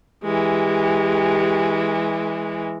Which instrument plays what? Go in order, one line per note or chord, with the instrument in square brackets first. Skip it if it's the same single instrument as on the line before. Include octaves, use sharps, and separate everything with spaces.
[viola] E3 G#3 [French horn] G4